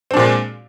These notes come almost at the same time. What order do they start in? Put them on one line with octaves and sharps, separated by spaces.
C4 D4 A#2 G#3